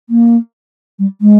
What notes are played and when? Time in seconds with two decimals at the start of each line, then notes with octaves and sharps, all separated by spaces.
0.10 A#3
0.99 G3
1.21 G#3